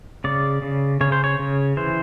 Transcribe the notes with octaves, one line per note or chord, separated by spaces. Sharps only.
C#3 D5
C#3
C#3 C#5
C5
C#5
C#3
E3 C5